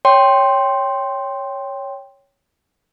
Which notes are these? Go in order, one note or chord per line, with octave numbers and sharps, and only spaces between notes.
C#5 G5 C6